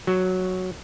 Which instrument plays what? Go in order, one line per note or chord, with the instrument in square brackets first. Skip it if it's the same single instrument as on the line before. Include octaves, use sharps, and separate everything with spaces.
[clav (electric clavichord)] F#3